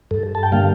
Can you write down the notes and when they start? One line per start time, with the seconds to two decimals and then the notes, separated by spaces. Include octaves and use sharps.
0.11 G2 A4
0.35 A5
0.43 G5
0.52 D3 G3 A#3 F5